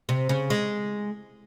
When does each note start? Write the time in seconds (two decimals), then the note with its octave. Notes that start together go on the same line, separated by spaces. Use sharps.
0.09 C3
0.29 C#3
0.50 G#3